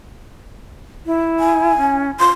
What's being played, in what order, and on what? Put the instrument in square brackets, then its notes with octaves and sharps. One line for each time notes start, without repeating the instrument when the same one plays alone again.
[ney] E4
[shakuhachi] G#5
[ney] C#4
[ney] F4 [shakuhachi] C6